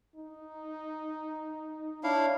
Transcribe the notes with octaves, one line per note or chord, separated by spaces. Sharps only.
D#4
D4 E4 C#5 F5